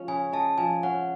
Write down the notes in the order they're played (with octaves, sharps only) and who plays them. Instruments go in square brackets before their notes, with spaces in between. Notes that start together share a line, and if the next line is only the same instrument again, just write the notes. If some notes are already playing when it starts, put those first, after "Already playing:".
Already playing: [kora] F3 G#3 C#4
[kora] C#3 [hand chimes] G#5
[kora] G#3 [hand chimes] A5
[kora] F3 [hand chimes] G#5
[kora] C#4 [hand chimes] F#5